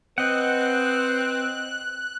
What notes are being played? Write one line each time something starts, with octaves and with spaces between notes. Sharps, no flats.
C4 B4 D#5 F#5 F#6